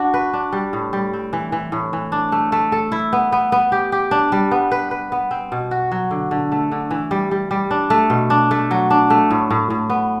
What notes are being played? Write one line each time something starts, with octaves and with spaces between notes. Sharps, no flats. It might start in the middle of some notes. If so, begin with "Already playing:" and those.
Already playing: D4 F#4
B4
D4
G3
A2
G3
C4
E3
E3
A2
E3
D4
A3
A3
A4
E4
B3
B3
B3
G4
G4
D4
G3
B3
B4
B4
B3
C4
B2
F#4
F#3
D3
D3
A3
D3
E3
G3
G3
G3
D4
A3
B2
D4
A3
F#3
D4
A3
A2
A2
A2
B3